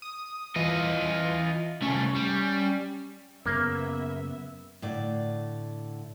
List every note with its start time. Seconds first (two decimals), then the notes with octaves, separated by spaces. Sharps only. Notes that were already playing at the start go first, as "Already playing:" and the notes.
0.02 D#6
0.56 E3 F4 D#5
1.82 C2 A3 C#4
2.15 G3
3.46 F#2 C#3 A#3 B3 E5
4.82 A2 D3 D5